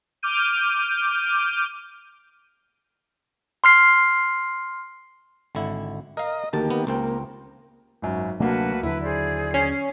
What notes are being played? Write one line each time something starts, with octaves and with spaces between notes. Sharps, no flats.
D6 F6 G6 D#7
C6 F6 C7
G#1 D3 E4
A#4 D#5 F5
D2 D#3 A#3 G4 A5
B3
C#2 A#3 C4 G5
G#1 F#2
D2 C3 F#3 A#3 D4 F#4 B4 A5
D#2 D3 F#3 E4 B4
G#4 C5 D5
C#4 C7